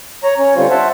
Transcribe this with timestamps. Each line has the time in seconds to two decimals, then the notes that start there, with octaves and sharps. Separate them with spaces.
0.23 C#5 A#5
0.38 C#4 C#5
0.56 D3 G3 C4 F4 C5 C#5
0.70 C5 E5 F#5 A5